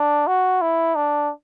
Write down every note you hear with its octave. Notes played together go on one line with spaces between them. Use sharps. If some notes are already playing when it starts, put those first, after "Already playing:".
Already playing: D4
F#4
E4
D4